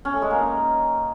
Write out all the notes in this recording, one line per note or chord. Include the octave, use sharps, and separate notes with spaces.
C#4
A3
G#3
A#3
D#4